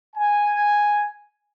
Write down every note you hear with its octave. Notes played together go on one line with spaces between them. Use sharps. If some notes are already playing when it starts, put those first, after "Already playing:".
G#5